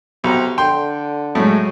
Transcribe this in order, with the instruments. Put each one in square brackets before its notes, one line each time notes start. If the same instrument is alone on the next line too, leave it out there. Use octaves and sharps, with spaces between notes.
[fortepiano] B1 A#5 [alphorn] C3
[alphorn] D3 [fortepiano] G5 C6
[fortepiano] A2 A3 [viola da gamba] F#3 G#3